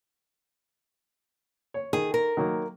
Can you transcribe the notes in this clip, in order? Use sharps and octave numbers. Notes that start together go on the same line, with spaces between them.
C#5
D#3 G#4
A#4
D#3 F#3 A#3